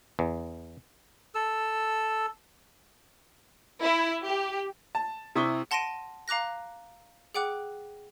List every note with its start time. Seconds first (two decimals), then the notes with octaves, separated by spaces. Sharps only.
0.19 E2
1.35 A4 E6
3.82 E4
4.24 G4
4.95 A5
5.35 C3 E4 C#6 D#6 B6 G7
5.71 F#5 A5 C6 A#6 D7 D#7
6.28 F5 A#5 D6 F#6 A#6
7.34 G#4 F#5 G5 D6 F#6